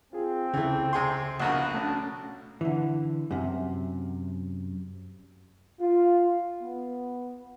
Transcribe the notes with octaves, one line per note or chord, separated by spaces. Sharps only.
C4 F4 G#4
C#2 C#3 E3 A3
C3 G#4 C6
A#1 B2 F#4 A#4
A3 C#4 D4
D3 E3
F#2 C3
F4
B3